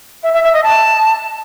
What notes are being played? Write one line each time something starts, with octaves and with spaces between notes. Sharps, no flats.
E5
E5
E5
D#5
A5